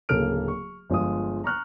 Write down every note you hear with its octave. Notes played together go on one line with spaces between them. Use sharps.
D1 C#3 A#3 A4 F6 D7
C#6
G1 F3 G#3 F4 G#4 D#6
A#5 C#6 F6 F#6